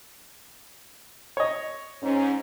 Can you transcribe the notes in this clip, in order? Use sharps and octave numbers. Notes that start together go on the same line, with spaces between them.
C#5 D#5
G#2 C#4